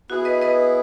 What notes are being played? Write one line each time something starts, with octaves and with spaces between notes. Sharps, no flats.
B3 E4 F#4 G#4
B4 D#5
B4 D#5